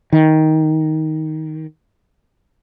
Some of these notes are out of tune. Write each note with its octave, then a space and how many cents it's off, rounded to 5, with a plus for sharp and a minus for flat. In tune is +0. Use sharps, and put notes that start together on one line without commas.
D#3 +10